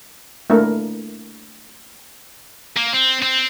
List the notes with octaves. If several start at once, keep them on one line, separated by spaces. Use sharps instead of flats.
A3 A#3 D4 E4 A#4
A#3
C4
C4